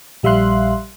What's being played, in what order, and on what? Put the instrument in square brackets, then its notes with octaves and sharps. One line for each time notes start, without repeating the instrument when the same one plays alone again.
[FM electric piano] A#1 G3 E5 F5 C6 F#6